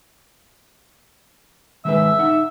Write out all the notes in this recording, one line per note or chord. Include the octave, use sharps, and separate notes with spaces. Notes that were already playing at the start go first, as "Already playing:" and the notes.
D#3 G#3 B4 E5
D#4 F#5